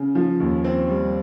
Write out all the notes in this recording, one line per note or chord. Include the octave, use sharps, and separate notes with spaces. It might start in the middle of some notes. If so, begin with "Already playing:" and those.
Already playing: C#3
F3
D#2
C4
G3